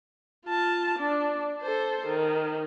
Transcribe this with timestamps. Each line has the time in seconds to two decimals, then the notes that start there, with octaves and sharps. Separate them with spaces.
0.46 F4 A5
0.98 D4
1.62 A4 C5
2.07 D#3